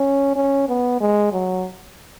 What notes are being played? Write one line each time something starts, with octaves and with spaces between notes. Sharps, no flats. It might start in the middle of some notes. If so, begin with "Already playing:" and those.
Already playing: C#4
C#4
B3
G#3
F#3